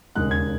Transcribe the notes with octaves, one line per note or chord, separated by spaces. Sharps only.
E1 D#2 C#3 G#3 D#4 F#6
G#6